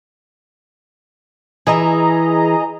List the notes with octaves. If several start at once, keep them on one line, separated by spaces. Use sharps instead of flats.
E3 G#4 D#5 A#5